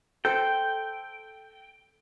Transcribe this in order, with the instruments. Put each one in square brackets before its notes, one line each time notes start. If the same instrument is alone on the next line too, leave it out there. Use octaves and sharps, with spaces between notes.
[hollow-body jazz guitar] A4 C5 [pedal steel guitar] G5